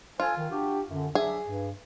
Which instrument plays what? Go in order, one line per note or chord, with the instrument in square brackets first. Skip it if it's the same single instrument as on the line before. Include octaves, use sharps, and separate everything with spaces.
[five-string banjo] F4 [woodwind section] A4 C5 G#5
[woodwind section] D#3
D4 F#4 G4
F#2 D3
[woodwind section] F#3 D4 E5 [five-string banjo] G#4
[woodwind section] G2